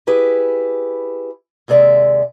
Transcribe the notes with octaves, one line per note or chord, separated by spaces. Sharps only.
E4 G4 G#4 B4
D#2 C3 G#3 D5 E5